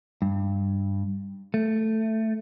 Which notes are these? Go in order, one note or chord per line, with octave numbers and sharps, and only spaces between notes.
G2
A3